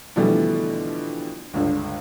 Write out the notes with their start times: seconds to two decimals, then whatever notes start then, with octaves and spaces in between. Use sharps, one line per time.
0.16 B2 D3 E3 F3 G3 A3
1.54 G1 C#2 D3